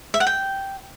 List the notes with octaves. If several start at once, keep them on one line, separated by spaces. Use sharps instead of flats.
E5
F#5
G5